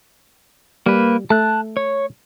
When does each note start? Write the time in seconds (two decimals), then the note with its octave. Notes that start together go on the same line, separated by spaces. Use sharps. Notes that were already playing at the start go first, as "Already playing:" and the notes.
0.86 G3 A#3 B4
1.30 A3 A5 F#6
1.77 C#5